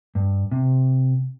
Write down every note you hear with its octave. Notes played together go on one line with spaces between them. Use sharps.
G2
C3